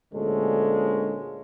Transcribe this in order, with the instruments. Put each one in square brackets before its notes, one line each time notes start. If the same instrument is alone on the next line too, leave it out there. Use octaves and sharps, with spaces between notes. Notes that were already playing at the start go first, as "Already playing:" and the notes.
[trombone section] D2 A#2 D3 G#3 C#4 A4